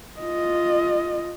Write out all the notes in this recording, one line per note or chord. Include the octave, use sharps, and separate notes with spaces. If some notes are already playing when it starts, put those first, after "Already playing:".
F4 D#5